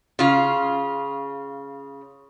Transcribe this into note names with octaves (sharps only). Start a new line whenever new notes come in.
C#3 F4